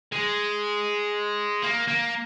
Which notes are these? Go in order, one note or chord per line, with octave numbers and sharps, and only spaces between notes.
G#3
A#3
A#3